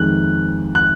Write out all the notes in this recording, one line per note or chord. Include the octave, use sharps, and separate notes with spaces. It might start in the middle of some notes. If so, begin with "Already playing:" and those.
Already playing: F2 D#3 G#3 F#6
F#6